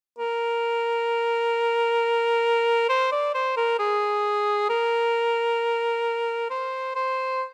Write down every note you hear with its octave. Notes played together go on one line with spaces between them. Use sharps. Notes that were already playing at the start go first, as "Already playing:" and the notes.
A#4
C5
D5
C5
A#4
G#4
A#4
C5
C5